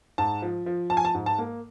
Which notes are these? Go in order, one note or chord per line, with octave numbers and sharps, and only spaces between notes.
G#2 A5
F3
F3
F3 A5
G#5
A5
G#2
A5
A#3